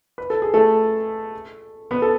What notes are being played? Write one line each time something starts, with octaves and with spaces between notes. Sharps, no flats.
B4
A4
G#4
A3 A4
B3 B4
A4